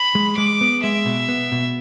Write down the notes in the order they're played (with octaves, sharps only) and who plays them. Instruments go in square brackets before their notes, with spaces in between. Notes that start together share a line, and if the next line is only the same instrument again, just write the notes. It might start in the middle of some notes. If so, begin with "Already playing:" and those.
Already playing: [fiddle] B5
[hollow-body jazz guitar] G#3
[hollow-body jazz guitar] G#3 [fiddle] D6
[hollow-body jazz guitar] B3
[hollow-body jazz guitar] G#3 [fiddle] E5
[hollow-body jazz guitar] B2
B3
B2